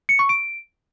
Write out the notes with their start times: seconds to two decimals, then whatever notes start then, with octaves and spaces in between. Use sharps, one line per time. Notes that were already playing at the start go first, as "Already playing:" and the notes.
0.09 C#7
0.19 C#6
0.29 D7